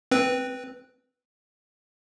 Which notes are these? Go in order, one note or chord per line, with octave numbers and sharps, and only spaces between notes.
C4 B4